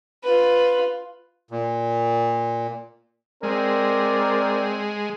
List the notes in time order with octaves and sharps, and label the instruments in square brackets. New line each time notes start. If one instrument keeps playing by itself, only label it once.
[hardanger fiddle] F4 B4
[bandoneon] A#2
[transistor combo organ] G#3 [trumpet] C4 [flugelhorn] A#4 [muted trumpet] D5